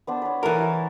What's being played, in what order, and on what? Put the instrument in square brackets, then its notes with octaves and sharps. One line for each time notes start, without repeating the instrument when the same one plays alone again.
[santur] B3 D4 C5
B4 C#5
[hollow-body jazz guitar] E3 A#4 [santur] E4 A4 A5
[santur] A4